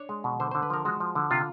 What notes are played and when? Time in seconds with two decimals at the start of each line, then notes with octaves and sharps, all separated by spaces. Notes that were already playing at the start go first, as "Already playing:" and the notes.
Already playing: D4 C#5
0.09 G#3
0.24 B2
0.40 D3 C5
0.51 D3 C5
0.63 B4
0.70 F3 A#4
0.85 G#3 F#4
1.00 F3
1.15 D3
1.31 C3 F4